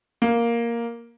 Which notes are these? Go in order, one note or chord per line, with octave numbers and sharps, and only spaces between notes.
A#3